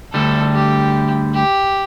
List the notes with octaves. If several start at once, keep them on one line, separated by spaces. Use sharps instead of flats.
D2 D3 G3 A4
G4
G4